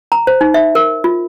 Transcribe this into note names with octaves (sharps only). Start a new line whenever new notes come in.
A#5
C5
D#4
E5
A#4
F4